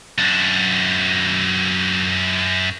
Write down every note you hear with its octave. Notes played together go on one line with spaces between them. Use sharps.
F#2 D4